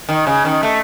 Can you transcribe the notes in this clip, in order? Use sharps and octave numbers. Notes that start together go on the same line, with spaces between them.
D#3
C#3
D#3
A3